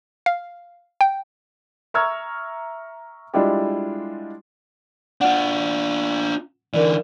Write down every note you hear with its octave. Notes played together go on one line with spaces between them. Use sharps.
F5
G5
E5 A#5 C#6 E6 F6 G#6
G3 G#3 D4 E4 F4 G4
D4 F4 F#5
D3 E3 A#4 D5